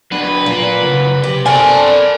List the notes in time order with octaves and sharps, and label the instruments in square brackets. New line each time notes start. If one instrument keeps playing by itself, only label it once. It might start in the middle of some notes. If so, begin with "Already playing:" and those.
[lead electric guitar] F#3 D4 [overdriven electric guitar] B4
[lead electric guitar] A#2 F4 [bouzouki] A#3
[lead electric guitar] C#3 F#3
[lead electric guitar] C3 [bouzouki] G4
[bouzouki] C4 D4 [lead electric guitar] A4 G5 [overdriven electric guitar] A#4 B5 [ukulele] G#5